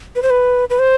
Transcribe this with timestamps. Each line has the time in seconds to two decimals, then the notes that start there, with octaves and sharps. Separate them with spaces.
0.16 B4
0.23 C5
0.30 B4
0.70 B4
0.79 C5